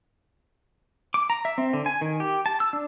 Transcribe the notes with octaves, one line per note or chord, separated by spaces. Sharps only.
D6
A#5
E5
C4
D3
G#5
D#3
G4
A5
E6
D4